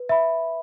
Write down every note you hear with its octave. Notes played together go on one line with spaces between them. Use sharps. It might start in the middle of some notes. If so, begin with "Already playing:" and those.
Already playing: B4
E5 B5